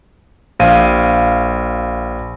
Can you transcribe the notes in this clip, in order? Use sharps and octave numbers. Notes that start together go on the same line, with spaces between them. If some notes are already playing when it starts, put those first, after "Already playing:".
A#1 F5 D#7